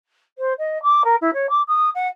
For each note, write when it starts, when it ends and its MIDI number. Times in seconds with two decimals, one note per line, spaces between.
0.38 0.53 72
0.58 0.81 75
0.82 1.02 86
1.04 1.15 70
1.21 1.30 64
1.33 1.49 73
1.49 1.61 86
1.68 1.89 87
1.94 2.07 78